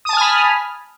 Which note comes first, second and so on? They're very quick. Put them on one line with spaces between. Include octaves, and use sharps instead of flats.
D#6 A5 G#5 F6 B5